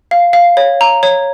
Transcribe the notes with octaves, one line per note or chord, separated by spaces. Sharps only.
F5
F5
C#5
A#5
C#5